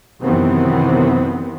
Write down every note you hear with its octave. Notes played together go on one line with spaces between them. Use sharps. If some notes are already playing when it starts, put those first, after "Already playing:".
F#2 C3 D#3 E3 B3 C4